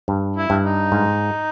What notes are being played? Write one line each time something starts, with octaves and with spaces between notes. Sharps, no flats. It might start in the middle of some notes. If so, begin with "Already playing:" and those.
G2
E4
G2
D#4
G#2